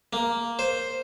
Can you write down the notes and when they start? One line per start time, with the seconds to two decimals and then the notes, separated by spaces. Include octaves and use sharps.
0.13 A#3
0.59 C5